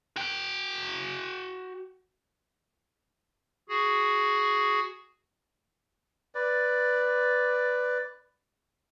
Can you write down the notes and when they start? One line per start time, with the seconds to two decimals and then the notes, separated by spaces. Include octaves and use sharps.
0.16 F#4 G5
3.69 F#4 G#4
6.35 B4 D5